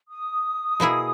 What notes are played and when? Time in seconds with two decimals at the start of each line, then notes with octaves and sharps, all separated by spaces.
0.10 D#6
0.80 B2 A#3 E4 G#4